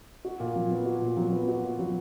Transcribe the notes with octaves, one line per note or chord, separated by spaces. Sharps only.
F#4
A#2
F#3
B3
F#4
A#2
F#3
B3
F#4
A#2
F#3